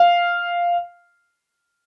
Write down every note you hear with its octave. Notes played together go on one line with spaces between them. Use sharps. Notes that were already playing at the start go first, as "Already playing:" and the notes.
Already playing: F5